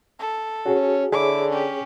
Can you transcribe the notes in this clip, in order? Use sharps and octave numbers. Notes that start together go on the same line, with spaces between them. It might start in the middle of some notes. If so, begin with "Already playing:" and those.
A4
C#4 F#4 G#4
D3 E4 G#4 C#5 D6
C#4 G4